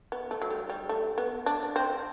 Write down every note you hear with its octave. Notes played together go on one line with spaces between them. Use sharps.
B3
A3
F#3
G3
G3
A3
B3
D4
C4